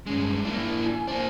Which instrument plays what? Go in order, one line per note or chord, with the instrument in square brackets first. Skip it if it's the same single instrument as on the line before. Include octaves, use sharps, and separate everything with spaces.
[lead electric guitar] G2 G#3 [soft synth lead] C#4
[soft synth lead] F#2
[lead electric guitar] A#3 D4 [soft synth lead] E4
[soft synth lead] G#5
[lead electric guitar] A#3 D4 [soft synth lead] C5